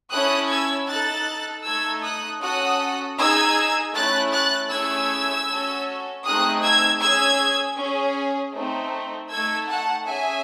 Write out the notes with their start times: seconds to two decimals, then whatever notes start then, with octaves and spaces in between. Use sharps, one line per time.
0.12 C#4 E4 A4 D#6 F#6
0.50 E6 G#6
0.88 D#4 A4 F#6 A6
1.65 A3 D#4 A4 E6 G#6
2.03 D#6 F#6
2.41 C#4 F#4 A4 D#6 F#6
3.17 D#4 G#4 E6 G#6
3.94 A3 C#4 E4 F#6 A6
4.32 F#6 A6
4.71 A3 C#4 E4 G#4 E6 G#6
5.47 C#4 F#4 A4
6.24 A3 C4 D#4 G#4 D#6 F#6
6.62 E6 G#6
7.01 C#4 G#4 E6 G#6
7.78 C#4 G#4
8.54 A3 C4 D#4
9.30 A3 D#4 A4 E6 G#6
9.68 F#5 A5
10.06 C#4 G#4 E5 G#5